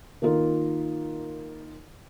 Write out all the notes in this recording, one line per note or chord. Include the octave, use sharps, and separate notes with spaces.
D#3 A#3 D#4 F4 A#4